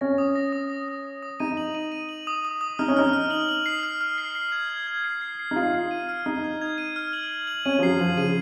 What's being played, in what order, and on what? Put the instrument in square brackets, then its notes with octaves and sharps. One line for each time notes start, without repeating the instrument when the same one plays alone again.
[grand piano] C#4 [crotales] A#6
[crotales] D#6
A#6
D#6
A#6
D#6
A#6
D#6
[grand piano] D#4 [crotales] D#7
[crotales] F#7
D#7
D#7
F#7
D#6
D#6
D#6
[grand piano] D#4 [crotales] F6
[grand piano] C#4
[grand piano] D#4 [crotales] F6
[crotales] F6
F#7
F#7
C7
F6
F6
C7
C7
G#6
G#6
G#6
C7
C7
C7
[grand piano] D#4
[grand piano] F4 [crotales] C7
[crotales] C7
D#7
F6
[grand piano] D#4 [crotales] F6
[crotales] G#6
G#6
D#7
F6
F#7
F#7
F#7
[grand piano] C#4 [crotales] D#7
[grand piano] F3
[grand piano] F#3 [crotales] C7
[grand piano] F3 [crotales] F#7
[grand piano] C#3 [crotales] D#7